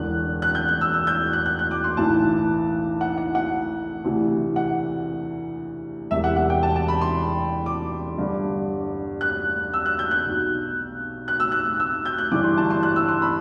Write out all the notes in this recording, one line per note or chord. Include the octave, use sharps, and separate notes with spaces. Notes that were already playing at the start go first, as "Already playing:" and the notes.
Already playing: E1 E2 D3 F#6
F#6
G6
F#6
E6
E6
G6
F#6
F#6
F#6
D6
C6
B1 A2 E3 A5
F#5
F#5
F#5
D2 C3 E3
F#5
E1 E2 C3 E5
F#5
F#5
G5
A5
A5
B5
C6
D6
G1 G2 D3
F#6
E6
F#6
G6
F#6
B1 B2
F#6
E6
F#6
E6
G6
F#6
G1 G2 E3 D6
C6
A5
C6
F#6
E6
C6
B5